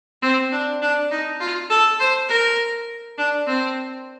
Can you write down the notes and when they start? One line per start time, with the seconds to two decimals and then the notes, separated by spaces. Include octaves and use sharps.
0.22 C4
0.52 D4
0.82 D4
1.11 D#4
1.40 F4
1.70 A4
2.00 C5
2.29 A#4
3.18 D4
3.47 C4